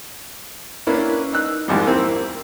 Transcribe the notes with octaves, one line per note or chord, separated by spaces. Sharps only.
A#3 C#4 D4 E4 B4
D#4 E6 F#6
C2 F2 G#2 G3
A#3 C4 E4 E6